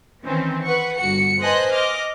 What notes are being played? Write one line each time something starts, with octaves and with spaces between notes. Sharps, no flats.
D#3 E3 C4 C#4
B4 F#5 C#6
G1 F#4 C#7
B4 C5 D#5 G#5 A5 F#6
D#5 D6 F6